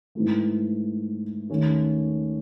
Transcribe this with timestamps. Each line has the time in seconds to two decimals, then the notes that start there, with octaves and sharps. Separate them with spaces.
0.15 G#2 E3 A3
1.50 D#2 D#3 A3 C#4